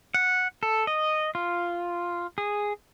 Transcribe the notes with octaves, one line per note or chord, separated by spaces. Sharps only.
F#5
A4
D#5
F4
G#4